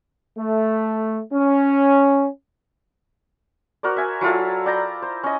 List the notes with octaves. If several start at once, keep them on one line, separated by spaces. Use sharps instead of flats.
A3
C#4
F#4 A#4 C5 D5
E5 G#5
F#3 E4 F4 A4
D5 G5 A#5
C5
C#4 D#5